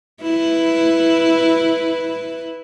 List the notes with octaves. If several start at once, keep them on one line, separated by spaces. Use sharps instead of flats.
E4 B4